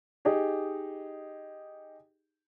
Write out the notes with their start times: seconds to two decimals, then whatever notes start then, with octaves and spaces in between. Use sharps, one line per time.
0.25 D#4 G4 G#4